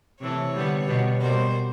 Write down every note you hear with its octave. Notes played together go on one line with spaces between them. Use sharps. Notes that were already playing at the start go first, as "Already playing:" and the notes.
C3 E3 A3 C#5
D3 G3 B3
B2 G3 B3
B2 G3 A#3 C5